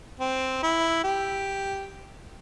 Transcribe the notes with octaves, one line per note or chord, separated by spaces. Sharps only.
C4
E4
G4